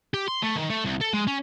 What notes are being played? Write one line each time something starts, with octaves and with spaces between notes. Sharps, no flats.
G4
C6
A3
D#3
A3
C2
A4
G#3
C#4